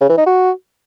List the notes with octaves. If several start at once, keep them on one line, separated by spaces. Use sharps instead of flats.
C#3
E3
D#4
F#4